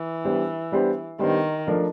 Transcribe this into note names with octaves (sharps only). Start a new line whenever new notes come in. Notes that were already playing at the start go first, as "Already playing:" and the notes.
Already playing: E3
G3 B3 D4 G4 C5
G3 B3 D4 G4 C5
D#3 G3 B3 D4 G4 C5
F3 A3 D4 F4 A#4